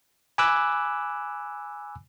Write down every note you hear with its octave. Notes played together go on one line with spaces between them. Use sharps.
G#5 B5 D6 E6 F#6